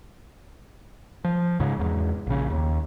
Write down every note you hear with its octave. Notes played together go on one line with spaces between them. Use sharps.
F3
C#2 G#2 C#3
E2 G#2
A#1 C#3
D#2